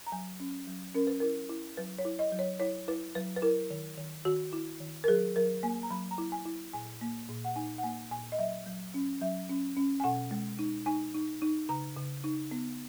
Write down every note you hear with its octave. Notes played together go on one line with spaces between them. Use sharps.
A#5
F#3 G#5
C#4
F#3
C#4 A#4
B4
E4 A#4
E4
F#3 B4
C#5
E4
D#5
F#3
C#5
E4 C#5
E4 B4
F#3 B4
B4
E4 A#4
D#3
D#3
D#3 F#4
E4
D#3
A#4
F#3 G#4
F#3 A#4
A#3 G#5
A#5
F#3 B5
A#5
E4
G#5
E4
A#2 G#5
A#3
A#2
F#5
D#4 G#5
F#5
A#3 G#5
A#2 G#5
D#5
F#3 E5
F#3
C#4
F#3 E5
C#4
C#4
G#5
B2 F#5
G#3
D#4
D#4 G#5
D#4
D#4
C#3 A#5
C#3
D#4
B3